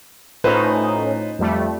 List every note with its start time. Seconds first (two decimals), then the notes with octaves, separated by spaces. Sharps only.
0.44 A2 C#4 D#4 F4 B4 C5
1.39 F2 G3 A3